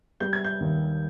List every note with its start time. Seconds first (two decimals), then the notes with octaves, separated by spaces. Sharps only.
0.20 G3 G6
0.33 G#6
0.44 G6
0.60 D#2